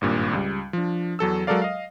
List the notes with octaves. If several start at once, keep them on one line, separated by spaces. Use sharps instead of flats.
G#1 G2 A#2
C#2 G3
F3 D4
E2 F#3 A4 E6
F#3 G#3 A4 A#4 D5 F5
D#5 F5